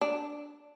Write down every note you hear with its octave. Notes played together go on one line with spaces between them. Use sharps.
D4